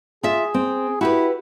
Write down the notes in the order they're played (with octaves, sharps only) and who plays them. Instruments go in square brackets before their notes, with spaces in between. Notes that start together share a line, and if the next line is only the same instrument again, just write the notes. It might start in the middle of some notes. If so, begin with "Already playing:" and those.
[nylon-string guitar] F4 E5 [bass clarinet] G#4
[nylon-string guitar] C4
[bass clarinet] E4 [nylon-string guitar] F#4 G4 B4